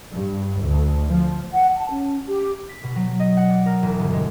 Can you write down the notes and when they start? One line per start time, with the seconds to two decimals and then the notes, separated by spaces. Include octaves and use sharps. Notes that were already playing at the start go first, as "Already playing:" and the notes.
0.12 G2
0.61 D2
1.08 F3
1.52 F#5
1.76 A5
1.90 C#4
2.28 G4
2.69 B6
2.84 B2
2.96 F#3
3.20 D#5
3.37 F#5
3.50 D5
3.66 A#4
3.83 E1
3.99 G1
4.13 G#3